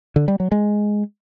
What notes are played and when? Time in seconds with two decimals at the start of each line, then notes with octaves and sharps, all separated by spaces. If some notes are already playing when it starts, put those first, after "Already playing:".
0.16 D3
0.28 G3
0.40 F#3
0.52 G#3